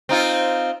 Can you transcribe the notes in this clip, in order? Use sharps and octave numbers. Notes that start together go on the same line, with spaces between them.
C4 D#4 F4